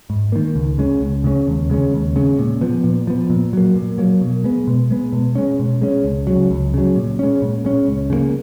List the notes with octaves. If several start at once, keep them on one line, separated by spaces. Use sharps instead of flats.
G#2
D#3 A#3
C#2
C#3 G#3 C#4
C#2
C#3 G#3 C#4
D#2
C#3 G#3 C#4
D#2
C#3 G#3 C#4
A#2
F3 B3
A#2
F3 B3
A#2
F#3 A#3
A#2
F#3 A#3
B2
G#3 B3
B2
G#3 B3
B2
G#3 C#4
B2
G#3 C#4
C#2
C#3 F#3
C#2
C#3 F#3
A#2
G#3 C#4
A#2
G#3 C#4
C#2
C#3 F3 A#3